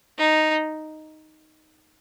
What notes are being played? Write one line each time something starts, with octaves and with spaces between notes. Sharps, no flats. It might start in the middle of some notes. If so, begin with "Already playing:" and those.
D#4